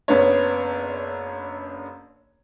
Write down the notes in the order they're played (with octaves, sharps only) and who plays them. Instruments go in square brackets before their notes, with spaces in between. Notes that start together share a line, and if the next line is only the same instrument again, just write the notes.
[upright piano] F#1 F#2 B3 D4 C#5